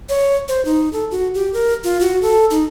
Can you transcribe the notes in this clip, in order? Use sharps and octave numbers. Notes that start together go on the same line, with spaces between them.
C#5
C5
D#4
A4
F#4
G4
A#4
F4
F#4
A4
D#4